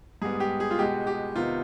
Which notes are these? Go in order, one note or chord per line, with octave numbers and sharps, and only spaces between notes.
G#2 G3 B3 G#4
G4
G#4
F4
B2 G#3 B3 G4
G4
C3 D#3 B3 F4